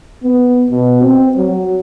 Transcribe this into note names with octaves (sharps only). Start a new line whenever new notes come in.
B3
B2
C4
F#3